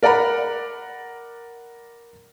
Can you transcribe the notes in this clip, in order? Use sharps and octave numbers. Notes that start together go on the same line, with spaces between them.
A#4 D5 F#5 A#5 B5